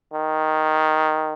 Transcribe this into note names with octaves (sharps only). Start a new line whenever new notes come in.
D#3